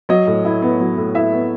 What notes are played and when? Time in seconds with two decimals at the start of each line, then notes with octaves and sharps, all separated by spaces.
0.09 F#3 D#5
0.27 A2
0.45 E4
0.62 B3
0.80 F#3
0.97 A2
1.14 E4 E5
1.32 B3